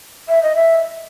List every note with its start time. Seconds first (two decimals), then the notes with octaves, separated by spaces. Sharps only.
0.28 E5
0.43 D#5
0.56 E5